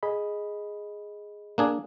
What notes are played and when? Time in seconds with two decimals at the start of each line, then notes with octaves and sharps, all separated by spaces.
0.03 G#4 D#5 B5
1.58 A#3 D4 G#4